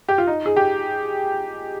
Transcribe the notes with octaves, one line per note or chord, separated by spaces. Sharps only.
G4
F4
D#4
G#4
G4